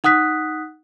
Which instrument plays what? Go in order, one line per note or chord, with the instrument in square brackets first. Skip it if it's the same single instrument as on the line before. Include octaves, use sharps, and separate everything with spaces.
[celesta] D#4 F#5 D#6 F#6 B6